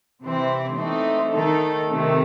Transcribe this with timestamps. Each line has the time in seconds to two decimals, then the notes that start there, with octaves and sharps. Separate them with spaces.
0.21 C3 E3 C4
0.77 E3 A3 C4 D#4
1.33 D#3 A3 D#4 A4
1.87 C3 D#3 A3